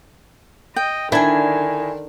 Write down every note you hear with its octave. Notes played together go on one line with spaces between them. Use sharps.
D#5 G5
D3 D#3 D4 E4 G#5